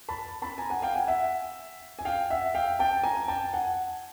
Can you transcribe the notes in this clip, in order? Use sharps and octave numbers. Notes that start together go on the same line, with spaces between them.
A5 B5
A5 B5
G#5 A#5
F#5 G#5
F5 G5
F#5 G#5
E5 F#5
G#5
F5 G5
E5 F#5
F5 G5
G5 A5
G#5 A#5
G5 A5
F#5 G#5